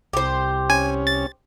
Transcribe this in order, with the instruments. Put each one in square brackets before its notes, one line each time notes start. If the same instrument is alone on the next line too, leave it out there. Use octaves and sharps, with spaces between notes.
[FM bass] C2 [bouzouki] G4 C5
[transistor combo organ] C#4 [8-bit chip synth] G#5
[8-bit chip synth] A6